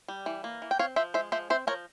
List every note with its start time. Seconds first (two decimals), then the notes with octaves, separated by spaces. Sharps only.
0.08 G3
0.26 E3
0.44 A#3
0.62 E3
0.71 G5
0.79 C4 C#5 F5
0.96 F3 C5 E5
1.14 G#3 C5 E5
1.32 F3 C5 E5
1.50 C4 C5 E5
1.67 F3 A#4 C#5